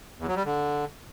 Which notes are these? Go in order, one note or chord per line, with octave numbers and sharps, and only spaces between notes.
E2
F#3
G3
D3